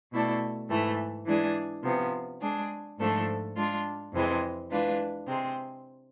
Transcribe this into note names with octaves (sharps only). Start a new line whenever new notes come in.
B2 A3 E4 A4 D5
G#2 E3 A3
E3 G#3 D4 G#4 D5
C3 F3 B3
G#3 D4 G#4
G#2 F3 A3 D4 A4
G#3 D4 F4
F2 C3 E3 G#3 C4
E3 G#3 D4 F4 B4
C3 G#3 C4